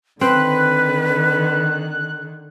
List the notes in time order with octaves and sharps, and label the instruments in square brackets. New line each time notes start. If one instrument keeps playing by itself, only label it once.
[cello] D3 D#3 [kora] C4 [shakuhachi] B4 [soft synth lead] F#6